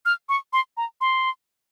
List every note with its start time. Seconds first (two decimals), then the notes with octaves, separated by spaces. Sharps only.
0.06 F6
0.29 C#6
0.53 C6
0.77 A#5
1.01 C6